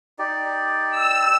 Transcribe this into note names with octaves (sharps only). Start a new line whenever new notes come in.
D#4 G4 D5
E6